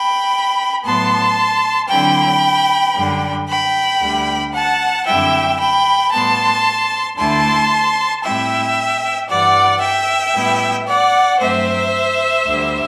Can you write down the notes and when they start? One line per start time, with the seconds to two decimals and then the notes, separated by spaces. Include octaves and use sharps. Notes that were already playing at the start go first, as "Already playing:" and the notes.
Already playing: G5 B5
0.84 A2 F#3 B3 A5 C6
1.89 D3 F#3 C4 E4 G5 B5
2.95 F#2 D3 G3 D4
3.48 G5 B5
4.01 D2 D3 G3
4.53 F#5 A5
5.06 F#2 D3 G3 C4 E4 E5 G5
5.59 G5 B5
6.12 A2 G3 B3 A5 C6
7.17 D2 D3 A3 E4 A5 C6
8.23 A2 G3 C4 E4 E5 G5
9.28 G2 E3 G3 D5 F#5
9.81 E5 G5
10.34 A2 G3 B3 E4
10.86 D5 F#5
11.39 G2 F#3 A3 C4 C5 E5
12.46 D2 D3 G3